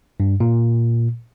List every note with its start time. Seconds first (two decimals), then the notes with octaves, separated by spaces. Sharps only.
0.20 G2
0.40 A#2